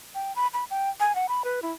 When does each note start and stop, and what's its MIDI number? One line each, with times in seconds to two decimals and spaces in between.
0.15 0.35 79
0.36 0.47 83
0.54 0.64 83
0.71 0.90 79
1.00 1.15 80
1.15 1.26 78
1.29 1.42 83
1.44 1.60 71
1.62 1.72 64